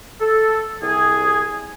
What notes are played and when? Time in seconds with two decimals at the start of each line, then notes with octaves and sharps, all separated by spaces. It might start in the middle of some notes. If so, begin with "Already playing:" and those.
0.21 A4
0.82 C2 G#4